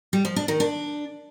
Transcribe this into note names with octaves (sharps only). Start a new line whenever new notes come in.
G3
F3
D4
D#3
D4